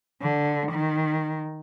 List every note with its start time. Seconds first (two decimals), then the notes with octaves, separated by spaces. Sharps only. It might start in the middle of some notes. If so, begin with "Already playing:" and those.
0.22 D3
0.72 D#3